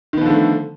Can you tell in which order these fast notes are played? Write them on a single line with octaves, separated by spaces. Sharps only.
D#3 B3 F3 D3 A3